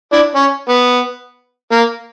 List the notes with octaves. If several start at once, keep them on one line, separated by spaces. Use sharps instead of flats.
D4 E4
C#4
B3
A#3